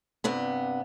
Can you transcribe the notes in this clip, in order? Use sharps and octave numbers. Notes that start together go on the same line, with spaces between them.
G2 C3 B3